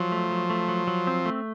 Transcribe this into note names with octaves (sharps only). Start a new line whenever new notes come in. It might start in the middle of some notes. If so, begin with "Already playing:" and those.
Already playing: F3 F#3
A3
F#3
A3
F#3
F#3
C4
A3